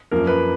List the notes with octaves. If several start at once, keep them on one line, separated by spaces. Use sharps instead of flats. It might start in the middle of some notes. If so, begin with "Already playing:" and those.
F#2 F3 A#3 A#4
B4